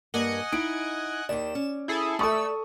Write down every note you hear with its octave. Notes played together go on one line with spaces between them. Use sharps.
G2 A#3 D#5 F#5 G#5
D#4 E4 D7
D#2 D#3 D5 E7
C#4
E4 G#4 A4
A3 A4 D5 C#6 D#6 E6